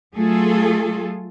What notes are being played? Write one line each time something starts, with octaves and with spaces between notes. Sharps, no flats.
F#3 A3 F4 G#4 A4